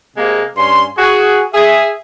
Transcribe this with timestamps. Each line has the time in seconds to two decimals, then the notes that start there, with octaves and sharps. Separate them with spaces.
0.17 C3 G#3 A#3
0.57 G2 C#4 G#5 C6
0.97 F#4 G#4
1.54 G#4 E5